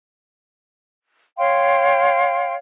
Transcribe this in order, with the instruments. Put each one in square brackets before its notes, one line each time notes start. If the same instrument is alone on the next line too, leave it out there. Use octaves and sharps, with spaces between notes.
[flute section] C#5 F5 G5 C6